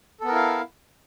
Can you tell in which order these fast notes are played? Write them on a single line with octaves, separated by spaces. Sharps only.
A4 B3 A#4 E4 F5